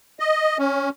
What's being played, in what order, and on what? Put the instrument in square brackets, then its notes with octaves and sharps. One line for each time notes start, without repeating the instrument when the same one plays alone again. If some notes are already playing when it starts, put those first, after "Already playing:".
[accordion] D#5
C#4